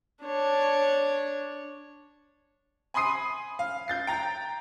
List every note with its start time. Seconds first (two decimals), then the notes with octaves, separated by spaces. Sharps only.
0.24 D4 C#5
2.94 G#5 B5 C6 D#6 C7 D#7
3.59 F5
3.88 G6 A6 C7
4.07 G5 A#5 A6